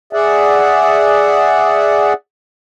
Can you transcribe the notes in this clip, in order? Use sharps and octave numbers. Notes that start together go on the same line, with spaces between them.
G#4 D5 E5 F#5